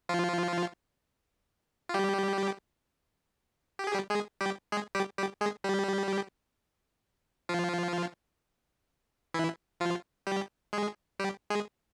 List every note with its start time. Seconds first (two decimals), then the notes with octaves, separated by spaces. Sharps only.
0.09 F3 F4
1.89 F4
1.94 G3 G4
3.79 G4
3.87 G#4
3.94 G3 G4
4.10 G#3 G#4
4.41 G3 G4
4.72 G#3 G#4
4.95 G3 G4
5.18 G3 G4
5.41 G#3 G#4
5.64 G3 G4
7.49 F3 F4
9.34 E3 E4
9.80 F3 F4
10.27 G3 G4
10.73 G#3 G#4
11.19 G3 G4
11.50 G#3 G#4